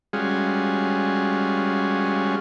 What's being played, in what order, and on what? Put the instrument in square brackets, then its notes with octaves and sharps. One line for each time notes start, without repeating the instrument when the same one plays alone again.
[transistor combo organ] G3 G#3 C#4 F4 F#4 G#4